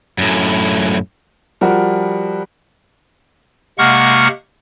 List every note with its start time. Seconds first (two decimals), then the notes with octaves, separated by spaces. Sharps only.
0.18 F#2 A2
1.61 F3 G3 F#4 A#4
3.78 C3 G#3 A#3 F#5 C#6 F6